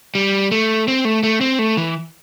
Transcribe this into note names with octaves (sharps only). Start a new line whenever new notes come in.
G3
A3
C4
A3
A3
C4
A3
E3